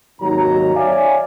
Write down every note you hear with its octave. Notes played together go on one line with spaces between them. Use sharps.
G#1 D#2 D#3 F#3 A#5
C#5 D5 E5 F5 G#5